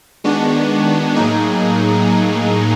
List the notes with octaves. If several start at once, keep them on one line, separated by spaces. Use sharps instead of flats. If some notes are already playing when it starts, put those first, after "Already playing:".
D#3 G#3 B3 D4 F#4
A2 F#3 A#3 D#4 G#4